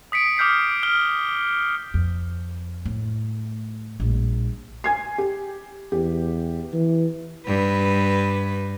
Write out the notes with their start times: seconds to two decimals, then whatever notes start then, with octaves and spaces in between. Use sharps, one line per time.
0.12 D#6 B6 C#7 D7
0.38 D6 D#6 F6 G6 B6 C7
0.83 F6 G7
1.94 F2
2.86 A2
4.00 A#1 G3
4.84 G#5 G#6 C7
5.18 G4
5.92 E2 G4
6.73 E3
7.47 G2 B4